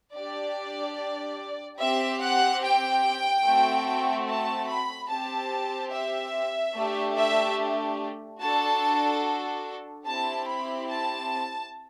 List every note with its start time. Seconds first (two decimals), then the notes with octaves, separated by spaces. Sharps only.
0.15 D4 G4 D5
1.80 C4 G4 E5
2.22 F#5
2.63 G5
3.45 A3 C4 F#4
4.28 A5
4.69 B5
5.10 C4 G4 A5
5.94 E5
6.76 A3 D4 G4
7.17 E5
8.41 D4 F#4 A4 A5
10.07 C4 E4 G4 A5
10.48 B5
10.89 A5